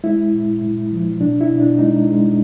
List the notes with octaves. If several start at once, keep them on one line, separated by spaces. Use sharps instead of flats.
G#3 E4
A#2
A#2
F3
B2 D4
E4
B2
D4
G#3 D#4
G#3